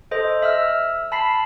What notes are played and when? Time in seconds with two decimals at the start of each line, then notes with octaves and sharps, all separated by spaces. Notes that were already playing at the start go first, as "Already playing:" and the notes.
0.11 A4 C5 D#5
0.42 E5 E6 F6
1.12 A5 B5 B6 C7